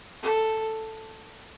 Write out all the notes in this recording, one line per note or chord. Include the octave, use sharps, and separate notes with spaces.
A4